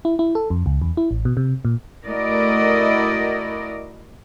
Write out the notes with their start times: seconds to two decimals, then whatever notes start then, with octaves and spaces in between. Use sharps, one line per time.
0.05 E4
0.19 E4
0.35 A4
0.50 F2
0.66 C#2
0.82 E2
0.97 E4
1.11 A1
1.25 B2
1.37 C3
1.65 A#2
2.06 A3 E4 F#4 A#4 D5 D#5